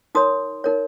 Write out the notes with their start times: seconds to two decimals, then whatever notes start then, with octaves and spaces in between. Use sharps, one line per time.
0.15 D#4 A#4 C#5 C6 D#6
0.64 D#4 A#4 C#5